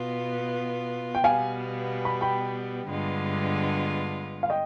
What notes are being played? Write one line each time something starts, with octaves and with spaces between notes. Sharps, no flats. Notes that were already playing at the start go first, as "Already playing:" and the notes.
Already playing: B2 B3 F4
G5
B2 G3 B3 F5 G#5
B5
G5 B5
G2 D3 G#3 B3 F4
F5
D#5 G5